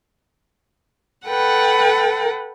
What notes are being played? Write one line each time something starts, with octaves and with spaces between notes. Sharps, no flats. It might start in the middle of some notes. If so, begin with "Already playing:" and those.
A4 B4 F#5 G5